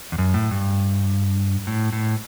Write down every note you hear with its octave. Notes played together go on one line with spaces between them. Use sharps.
E2
F#2
A2
G2
A2
A2